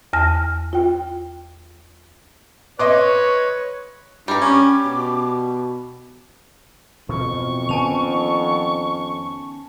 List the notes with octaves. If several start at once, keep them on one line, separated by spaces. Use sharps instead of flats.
E2 G#5 A5 F6 A#6
F4 G5
B4 C#5 D#5 C6 D6
G2 G3 A#5 D6
C#4 D6
B2
F2 B2 E3 F#3 C#6
D#3 B3 C#4 G#5 A5 F7